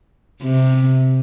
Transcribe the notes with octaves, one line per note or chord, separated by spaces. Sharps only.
C3